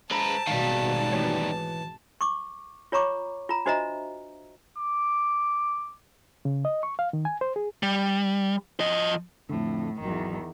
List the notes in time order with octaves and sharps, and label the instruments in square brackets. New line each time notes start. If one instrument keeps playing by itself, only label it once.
[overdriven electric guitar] G#3 B4 [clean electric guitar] C5 A#5 [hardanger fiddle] A5
[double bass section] G#1 B2 [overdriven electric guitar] D#3 G3 [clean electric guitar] F5
[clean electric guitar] E3 C#5
[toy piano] C#6 D6
F4 C#5 A#5 C#6 D6
F4 A#5
D4 F#4 C5 D#5 E5 A#5
[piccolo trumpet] D6
[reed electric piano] C#3
D#5
C#6
F5
D#3
G#5
C5
G#4
[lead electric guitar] G3
F3 D#5
[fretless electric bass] F2 D3 [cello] A2
[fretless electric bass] G#1 F#3 [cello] E2 D#3